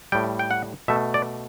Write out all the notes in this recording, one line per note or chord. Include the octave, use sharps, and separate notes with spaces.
A2 G3 G5
G5
F#5
B2 A3 E5
D5